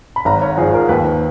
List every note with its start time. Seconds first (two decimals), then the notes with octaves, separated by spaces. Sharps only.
0.16 B5
0.25 G#1 A#5
0.42 C#5
0.57 G#2 F3 G#4
0.74 A#4
0.89 D#2 B4